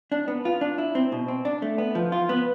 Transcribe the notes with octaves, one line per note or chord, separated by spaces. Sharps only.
D4
B3
F4
D4
E4
C4
B2
C4
D4
A3
B3
F3
F4
B3